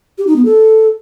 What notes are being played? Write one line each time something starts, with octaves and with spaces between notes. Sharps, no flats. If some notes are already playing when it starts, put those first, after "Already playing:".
G4
D#4
B3
A4